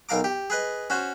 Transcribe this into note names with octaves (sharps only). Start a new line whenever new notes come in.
B1 A#4 F5 A#5 D6
G4
G#4 B4 D#5
C#4 F#4 C5